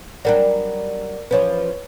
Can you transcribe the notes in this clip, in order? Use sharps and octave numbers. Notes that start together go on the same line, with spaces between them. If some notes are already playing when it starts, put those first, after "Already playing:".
F#3 G3 D4 A#4 D5
E3 F3 C#4 B4 C#5